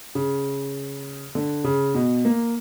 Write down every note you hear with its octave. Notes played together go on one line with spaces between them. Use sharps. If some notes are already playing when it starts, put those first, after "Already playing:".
C#3
D3
C#3
B2
A#3